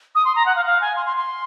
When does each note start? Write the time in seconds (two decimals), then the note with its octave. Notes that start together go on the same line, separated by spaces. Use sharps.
0.15 D#6
0.25 C6
0.36 A#5
0.46 F#5
0.56 F5
0.66 F5
0.81 G#5
0.96 C6
1.06 C6
1.17 C6